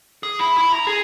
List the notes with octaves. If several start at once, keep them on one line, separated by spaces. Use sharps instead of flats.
G#4
E4
E4
A#5
G#4